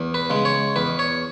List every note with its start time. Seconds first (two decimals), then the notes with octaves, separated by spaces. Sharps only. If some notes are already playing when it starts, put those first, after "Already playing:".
Already playing: E2
0.14 B4
0.30 C#3 G#3
0.45 C#5
0.76 E2 B4
0.99 C#5